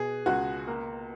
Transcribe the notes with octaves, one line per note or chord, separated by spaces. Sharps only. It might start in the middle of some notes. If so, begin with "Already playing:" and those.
Already playing: B2 G#4
C#2 F#4
A#3